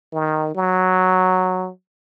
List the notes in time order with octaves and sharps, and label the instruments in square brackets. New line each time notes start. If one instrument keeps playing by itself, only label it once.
[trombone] D#3
F#3